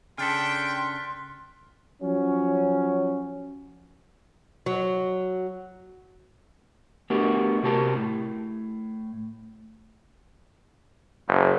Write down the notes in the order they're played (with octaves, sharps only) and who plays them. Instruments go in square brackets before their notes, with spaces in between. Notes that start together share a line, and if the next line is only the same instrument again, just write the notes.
[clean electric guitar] C#3 D4 A4 [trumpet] G5 [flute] C6 [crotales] F6 F#6 B6
[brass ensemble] F3 F#3 C#4
[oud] F#3
[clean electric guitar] A3 B3 D4 F#4 G4 A#4
C3 F#4 G4 A#4 A5
A2
[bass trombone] F#1